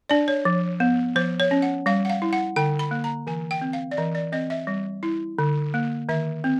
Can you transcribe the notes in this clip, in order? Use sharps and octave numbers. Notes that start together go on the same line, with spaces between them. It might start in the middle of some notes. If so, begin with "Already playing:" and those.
D4 D5
C#5
F3
B3
F3 C5
C#5
C#4
F#5
G3 F5
F#5
F5
E4
F#5
D3 G5
B5
A#3
A#5
E3 G#5
G5
C4
F5
D5
E3 D#5
D5
C4 D#5
E5
G3
E4
D3
A#3
D#3 E5
C4